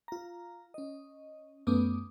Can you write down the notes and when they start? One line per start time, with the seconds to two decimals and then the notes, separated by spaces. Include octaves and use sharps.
0.08 F4 A#5
0.74 C#4 D#5
1.67 F#2 A3 B3 C#4 D6 D#6